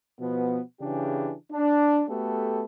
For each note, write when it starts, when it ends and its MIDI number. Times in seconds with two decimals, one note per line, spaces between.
0.20 0.61 47
0.20 0.61 53
0.20 0.61 59
0.81 1.33 49
0.81 1.33 52
0.81 1.33 62
0.81 1.33 67
0.81 1.33 68
1.52 2.03 62
2.09 2.63 57
2.09 2.63 59
2.09 2.63 66
2.09 2.63 67
2.09 2.63 69